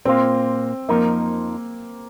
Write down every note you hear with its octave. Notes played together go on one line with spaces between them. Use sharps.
A#2 A#3 C4 F4
F2 F3 A#3 D#4 A#4